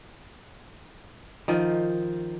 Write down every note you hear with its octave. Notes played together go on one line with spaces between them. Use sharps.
D#3 F3